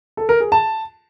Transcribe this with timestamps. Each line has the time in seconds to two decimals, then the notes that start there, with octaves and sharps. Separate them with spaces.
0.17 A4
0.29 A#4
0.40 G#4
0.52 A5